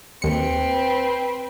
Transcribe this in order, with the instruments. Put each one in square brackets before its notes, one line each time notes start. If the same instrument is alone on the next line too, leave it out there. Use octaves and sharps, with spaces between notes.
[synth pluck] D#2 C#7 [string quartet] C4 B4